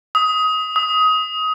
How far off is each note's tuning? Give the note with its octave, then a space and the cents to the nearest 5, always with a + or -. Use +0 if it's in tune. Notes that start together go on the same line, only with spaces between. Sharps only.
D#6 +20
D#6 +20